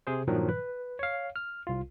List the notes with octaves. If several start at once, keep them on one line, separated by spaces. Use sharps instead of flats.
C3 G#4 C5
G2 A#2 D#3 F3 F#3
B4
C#5 F5
F6
C2 F4